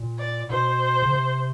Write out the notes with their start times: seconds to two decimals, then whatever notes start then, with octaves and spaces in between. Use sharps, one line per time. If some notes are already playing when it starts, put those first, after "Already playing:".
Already playing: A#2
0.18 D5
0.49 B2 C5
1.02 C#3
1.12 C3